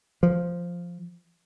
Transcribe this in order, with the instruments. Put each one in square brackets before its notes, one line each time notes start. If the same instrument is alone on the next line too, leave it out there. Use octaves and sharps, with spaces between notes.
[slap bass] F3